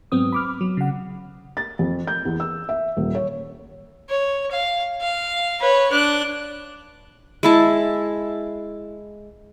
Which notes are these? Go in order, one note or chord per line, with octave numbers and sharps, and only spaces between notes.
G#2 F#3 B3 C4 D#6
B5 D6 F6
F#3
C#3 F#5
A6
F2
G6
E2
E6
E5
D#1
C#5
C#5
F5
F5
B4 C#5
D4 F#6
G#3 E4 A5